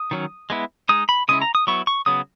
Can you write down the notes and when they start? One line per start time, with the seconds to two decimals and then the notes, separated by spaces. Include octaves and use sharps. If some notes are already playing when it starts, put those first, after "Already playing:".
Already playing: D#6
0.11 D#3 F#3 C#4
0.50 G#3 B3 E4
0.89 G#3 D#4 D#6
1.09 B5
1.29 C#3 G#3 C#4 E4 D#6
1.42 A#5
1.55 D#6
1.67 F#3 B3 E4 C#6
1.87 C#6
2.06 C#3 F#3 B3 D#6